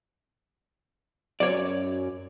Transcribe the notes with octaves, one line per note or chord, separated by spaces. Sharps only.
F#2 C#5 D5